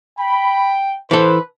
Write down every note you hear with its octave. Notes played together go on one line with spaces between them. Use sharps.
G5 B5
E3 A4 B4 C5